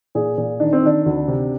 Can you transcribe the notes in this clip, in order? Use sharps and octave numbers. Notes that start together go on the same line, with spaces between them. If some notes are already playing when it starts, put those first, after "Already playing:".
A#2 G#4
A#2
D#3 D4
C4
D#3 D4
D2
C3